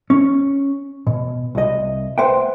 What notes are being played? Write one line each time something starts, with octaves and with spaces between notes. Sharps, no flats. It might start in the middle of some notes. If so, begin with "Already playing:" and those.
C#4
B2
C2 D#5
B4 C5 E5 F#5 G5